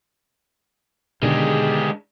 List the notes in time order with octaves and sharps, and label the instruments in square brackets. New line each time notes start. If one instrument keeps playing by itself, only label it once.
[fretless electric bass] B2 D3 D#3 [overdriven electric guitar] G#3 D4 [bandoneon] G4 G#4